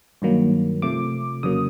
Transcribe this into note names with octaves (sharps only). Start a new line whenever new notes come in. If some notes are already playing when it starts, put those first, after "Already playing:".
G2 D#3 F#3 A#3
C3 F3 A3 D6
F2 C#3 F#3 A#3 D#6